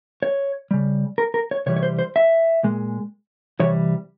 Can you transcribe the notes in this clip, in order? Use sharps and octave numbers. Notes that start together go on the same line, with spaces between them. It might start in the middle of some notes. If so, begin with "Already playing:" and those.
C#5
C#3 G3
A#4
A#4
C#5
C3 E3 G3 C#5
C#5
C5
C5
E5
A#2 G#3
C3 E3 G3 C#5